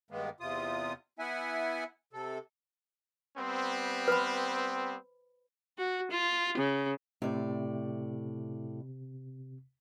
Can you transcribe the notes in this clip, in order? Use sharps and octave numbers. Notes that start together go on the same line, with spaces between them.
G2 D#3 G#3 A#3 B3
E2 C3 F4 D#6
B3 E4 E5 F#5 G#5
C3 A4
G3 B3 C4
B4 C5 B5
F#4
F4
C#3
A2 C3 D5